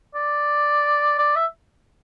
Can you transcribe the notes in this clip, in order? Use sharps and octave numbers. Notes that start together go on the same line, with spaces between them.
D5
D5
E5